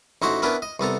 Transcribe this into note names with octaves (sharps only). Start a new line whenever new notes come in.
A1 D#4 E4 F#4 C5
B3 C#4 D4 E4 A#4 B4
D#5
C2 B3 A4 A#5